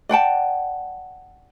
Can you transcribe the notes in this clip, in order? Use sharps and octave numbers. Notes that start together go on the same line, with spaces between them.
D5 F#5 G5 A5